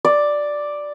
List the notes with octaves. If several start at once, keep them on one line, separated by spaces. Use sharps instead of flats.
D5